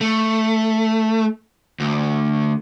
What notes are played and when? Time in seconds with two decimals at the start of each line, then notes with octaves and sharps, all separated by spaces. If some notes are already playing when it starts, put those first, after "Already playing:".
0.01 A3
1.80 D2